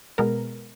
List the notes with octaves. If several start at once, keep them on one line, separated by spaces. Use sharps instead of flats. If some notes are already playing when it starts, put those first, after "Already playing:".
B2 G#3 B3 A#4